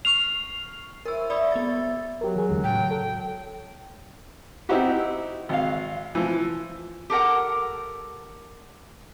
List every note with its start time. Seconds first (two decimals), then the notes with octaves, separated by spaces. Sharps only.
0.05 C#6 F6 C7 F7
1.06 E4 A#4 C5 C#5 E6
1.30 E4 C#5 D5 E5 B5 D#6
1.52 G3 B3 A6
2.21 F#3 G4 A#4
2.36 E3 G#4
2.49 E2 D3 G#3
2.64 A2 C#3 G5
2.91 A4
4.69 C4 D#4 E4 F#4 G4
5.49 G#1 F5
6.15 E3 F3
7.10 G4 A4 A#4 F#5